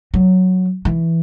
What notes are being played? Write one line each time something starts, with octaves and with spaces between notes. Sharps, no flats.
F#3
E3